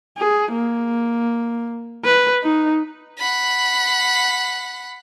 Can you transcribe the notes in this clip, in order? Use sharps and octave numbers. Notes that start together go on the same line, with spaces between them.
G#4
A#3
B4
D#4
F#5 B5